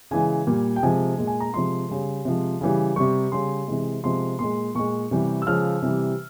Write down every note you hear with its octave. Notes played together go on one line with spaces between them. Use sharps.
C#3 E3 G#3 G#5
A#2 G3
G5
C3 F3 G#3 G#5
A#2 G#3
G#5
A#5
C3 F3 G#3 C6
C#3 G3
C3 F3 G#3
C#3 E3 G3
C3 G3 C#6
C#3 G3 C6
C3 E3 G#3
C3 F3 G#3 C6
A#2 G#3 C6
A#2 G#3 C#6
C3 E3 G3
E6
C#3 F3 G#3 F6
C3 E3 G3